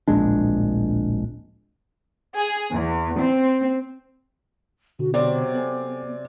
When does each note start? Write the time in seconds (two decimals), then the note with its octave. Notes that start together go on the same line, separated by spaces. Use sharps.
0.08 D1 A#1 G#3 D4
2.36 G#4
2.72 E2
3.19 C4
4.99 B2 D3 F#4
5.14 C3 F#3 B3 C4 D5
5.54 A4 G#5